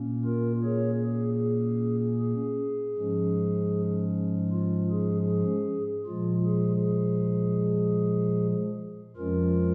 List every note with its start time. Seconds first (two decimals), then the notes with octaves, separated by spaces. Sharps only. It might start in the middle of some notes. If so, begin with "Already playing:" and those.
Already playing: A#2 A#3 C#4
0.25 F4 A#4
0.63 G#4 C#5
1.02 G#4
1.41 G#4
2.18 G#4
2.96 G#2 F3 G#3 C#4
4.51 F4
4.90 G#4
5.29 G#4
6.06 A#2 F3 G#3 F4
6.45 G#4
6.84 G#4
9.16 F2 F3 G#3 C#4 F4 A#4